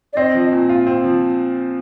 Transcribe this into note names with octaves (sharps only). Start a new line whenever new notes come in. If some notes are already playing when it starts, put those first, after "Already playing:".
D5
C4 D#5
F3
A#2
F4
C4
F3